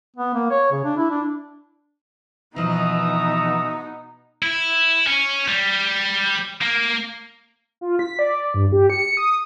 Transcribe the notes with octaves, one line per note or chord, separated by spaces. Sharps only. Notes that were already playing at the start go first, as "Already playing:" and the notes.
B3
A#3
C#5
C#3
D4
E4
D4
B2 E3 F3 B3 D#4 E5 A#5 D#6
E4
C#4
G3
A#3
F4
B6
D5
G2
G4
C#7
D#6